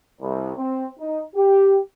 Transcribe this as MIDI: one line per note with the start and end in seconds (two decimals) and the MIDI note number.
0.21 0.52 36
0.57 0.87 60
0.99 1.21 63
1.36 1.78 67